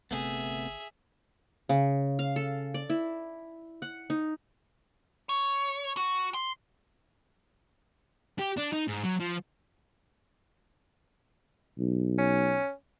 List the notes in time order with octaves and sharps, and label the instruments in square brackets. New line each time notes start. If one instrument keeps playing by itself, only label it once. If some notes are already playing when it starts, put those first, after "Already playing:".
[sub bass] G1 [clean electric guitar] C3 A3 B3 [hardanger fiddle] G#4 E5
[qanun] C#3
F5
A4
D5
E4
F#5
D#4
[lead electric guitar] C#5
F#4
C6
[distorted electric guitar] G4
D4
D#4
G#2
F#3
F3
[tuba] B1
[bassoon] C#4